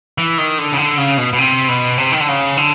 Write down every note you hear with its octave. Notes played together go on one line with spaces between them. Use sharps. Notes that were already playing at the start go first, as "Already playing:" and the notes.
E3
D#3
D3
C#3
D3
C#3
B2
B2
C3
B2
C3
D#3
D3
C#3
D3